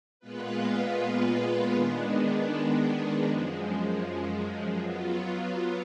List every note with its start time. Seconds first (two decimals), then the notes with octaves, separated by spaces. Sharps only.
0.20 A#2 G#3 B3 F4 B4
1.72 D#3 G#3 B3 D4
3.24 F#2 F3 G#3
4.76 F#3 B3 F4